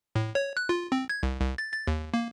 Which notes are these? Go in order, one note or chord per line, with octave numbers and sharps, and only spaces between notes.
A2
C#5
F#6
F4
C4
G#6
C2
C2
A6
A6
D#2
A#3